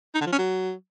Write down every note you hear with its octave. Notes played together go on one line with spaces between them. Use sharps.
D#4
D3
F3
C#4
F#3